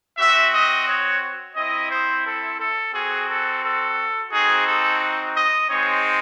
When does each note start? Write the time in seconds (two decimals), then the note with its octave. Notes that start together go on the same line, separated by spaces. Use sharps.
0.18 C4 F#4 E5
0.54 D#5
0.88 C#5
1.56 C4 E4 D#5
1.91 C5
2.26 A4
2.60 A4
2.94 C4 F#4 G#4
3.29 A4
3.63 A4
4.32 C4 D#4 F#4 G#4
4.67 A4
5.36 D#5
5.70 G#3 C4 D#4 C#5